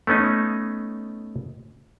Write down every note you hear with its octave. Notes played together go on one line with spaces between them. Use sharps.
A3 B3 C#4 D#4